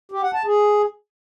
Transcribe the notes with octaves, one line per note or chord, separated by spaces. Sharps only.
G4
F#5
A5
G#4